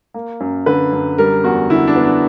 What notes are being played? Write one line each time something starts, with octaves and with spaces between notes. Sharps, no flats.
A#3
F#2
D3 B4
F#2
G3 A#4
E2 F#4
D3 E4
D4
B3
D4